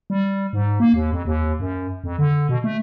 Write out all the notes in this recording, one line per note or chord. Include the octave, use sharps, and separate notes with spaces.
G3
G#2
A#3
D#2
F2
D#2
F#2
F2
D3
B2
A3